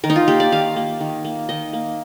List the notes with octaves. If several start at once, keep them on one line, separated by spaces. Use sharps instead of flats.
D#3 A#4
D#4
F4
A#3 G4
D5
D#3 F5
A#3
D#3
A#3
D#3 D#5
A#3